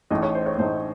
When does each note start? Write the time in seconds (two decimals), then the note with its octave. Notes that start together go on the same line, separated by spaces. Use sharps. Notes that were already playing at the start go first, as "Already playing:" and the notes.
0.10 A1 A2 A3 D#4 D#5
0.23 C#5
0.35 C5
0.46 C#5
0.58 A1 A2 A3 D#4 C5